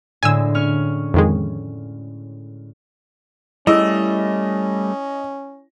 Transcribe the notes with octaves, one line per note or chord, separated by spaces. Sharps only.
A2 D3 G#3 G#5 E6
C#4 C#6 F6
F2 D#3 G#3
G3 A3 C#4 E4 G#4 D#5 E6